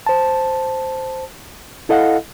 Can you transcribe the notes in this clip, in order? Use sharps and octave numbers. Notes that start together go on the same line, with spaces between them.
C5 A5
E4 A4 D#5 F5 F#5